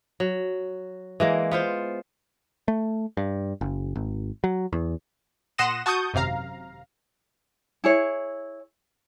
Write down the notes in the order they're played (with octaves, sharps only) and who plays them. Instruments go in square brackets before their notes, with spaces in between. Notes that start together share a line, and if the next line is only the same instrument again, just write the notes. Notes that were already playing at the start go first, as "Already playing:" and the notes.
[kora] F#3
E3 G#3 A#3
B3 F4 C5
[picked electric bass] A3
G2
F#1
G#1
F#3
E2
[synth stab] A#2 F#5 C6 D#6 A#6 E7
F#4 A5 C#6 D#6 G6
G#1 F#2 C3 F5 A#5
[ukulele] E4 G#4 C#5